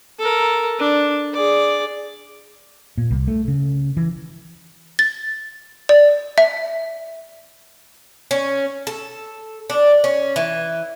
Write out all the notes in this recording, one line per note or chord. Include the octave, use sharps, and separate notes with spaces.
A4 A#4
D4
G#4 D5
A#2
C2
A3
C#3
E3
A6
D5
E5
C#4
A4
D4
C#4
E3